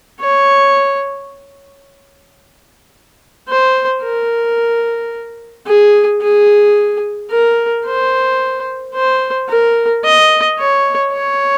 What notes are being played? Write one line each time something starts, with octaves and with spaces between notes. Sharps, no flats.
C#5
C5
A#4
G#4
G#4
A#4
C5
C5
A#4
D#5
C#5
C#5